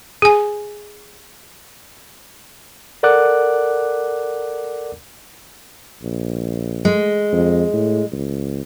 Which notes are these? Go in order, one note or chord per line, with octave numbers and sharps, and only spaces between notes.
G#4 G#5
A4 A#4 D5 F#5 D6 F#6
A#1
G#3
F2
A2
C#2